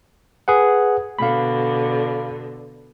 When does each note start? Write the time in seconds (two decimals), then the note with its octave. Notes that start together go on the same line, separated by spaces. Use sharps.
0.48 G#4 B4 F#5
1.19 B2 D3 F5 B5